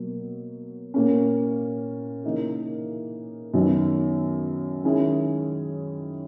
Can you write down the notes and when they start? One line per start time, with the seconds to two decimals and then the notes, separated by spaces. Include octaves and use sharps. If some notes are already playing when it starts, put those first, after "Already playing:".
Already playing: B2 F#3 A#3
0.94 A#2 A#3 C#4
2.24 C#3 E3 A#3 D#4 A#4
3.54 F#2 D#3 F#3 B3 D#4
4.84 D#3 G#3 C#4 E4 G#4